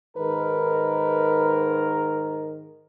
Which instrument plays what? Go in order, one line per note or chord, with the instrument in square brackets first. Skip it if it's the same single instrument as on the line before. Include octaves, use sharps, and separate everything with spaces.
[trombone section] G#2 D#3 A#4 [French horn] B4